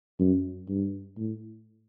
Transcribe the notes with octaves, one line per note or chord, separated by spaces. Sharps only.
F#2
G2
A2